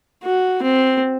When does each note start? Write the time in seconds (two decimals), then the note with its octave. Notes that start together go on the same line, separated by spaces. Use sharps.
0.23 F#4
0.63 C4